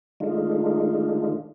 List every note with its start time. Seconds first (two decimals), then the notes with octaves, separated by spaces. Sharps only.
0.20 D#3 G#3 A3 D4 D#4 F4